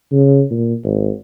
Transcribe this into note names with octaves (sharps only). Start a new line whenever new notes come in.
C#3
A#2
G#1